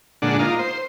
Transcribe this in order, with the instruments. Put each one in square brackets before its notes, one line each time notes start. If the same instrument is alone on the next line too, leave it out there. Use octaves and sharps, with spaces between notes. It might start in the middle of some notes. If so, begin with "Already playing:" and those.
[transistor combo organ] A#2 D3 G#3 D4 F#5
A#3 D#4 F4
C5